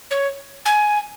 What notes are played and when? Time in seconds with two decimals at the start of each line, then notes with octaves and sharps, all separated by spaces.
0.11 C#5
0.65 G#5